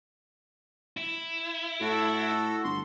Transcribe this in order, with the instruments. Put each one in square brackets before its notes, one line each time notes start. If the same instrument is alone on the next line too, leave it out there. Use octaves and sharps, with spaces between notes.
[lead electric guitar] E4
[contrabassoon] A2 [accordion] F#4 A4
[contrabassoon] G1 [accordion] C6